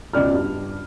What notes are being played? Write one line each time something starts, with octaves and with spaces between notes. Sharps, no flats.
E1 C#2 D5 F6
G2